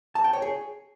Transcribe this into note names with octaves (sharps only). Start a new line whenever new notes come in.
A5
G5
C#5
G#4